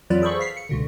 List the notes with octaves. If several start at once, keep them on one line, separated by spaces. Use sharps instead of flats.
F2 E3 F#3 F4 B4 D5
G#4 A4 C5 B5 C#6
F5 B6 C7
C#7
C#2 B2 D3